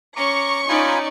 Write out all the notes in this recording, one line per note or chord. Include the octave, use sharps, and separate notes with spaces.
C#4 A#5 C#6 D6
C#4 D#4 F4 D5 G#5 B5